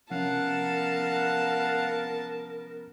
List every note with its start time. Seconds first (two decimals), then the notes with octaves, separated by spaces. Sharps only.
0.11 C3 F3 B3 C#4 A#4 F5 F#5 A5